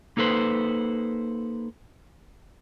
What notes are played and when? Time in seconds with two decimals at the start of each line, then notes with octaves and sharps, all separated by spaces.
0.17 A#3 D#4 A4 B4 C5